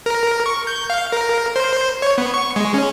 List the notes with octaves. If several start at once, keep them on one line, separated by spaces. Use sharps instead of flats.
A#4
C#6
G6
F5
A#4
C5
C#5
B3
C#6
G#3
C#4